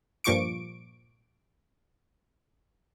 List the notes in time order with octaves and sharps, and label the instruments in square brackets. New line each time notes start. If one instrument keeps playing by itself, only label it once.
[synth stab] G2 A#2 F3 C#6 D6 D7